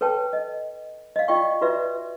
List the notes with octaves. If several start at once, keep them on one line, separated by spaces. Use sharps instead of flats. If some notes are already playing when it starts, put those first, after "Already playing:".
A4 B4 C#5 G5 A5
D#5
D#5 F5
F4 D5 D#5 G5 C#6
F4 F#4 B4 D5 E5